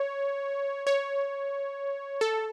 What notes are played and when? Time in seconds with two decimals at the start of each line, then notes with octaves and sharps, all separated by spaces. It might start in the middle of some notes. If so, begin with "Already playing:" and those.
Already playing: C#5
0.87 C#5
2.21 A4